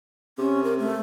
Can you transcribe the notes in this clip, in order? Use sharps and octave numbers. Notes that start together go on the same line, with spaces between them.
C3 C#4
A#4
A3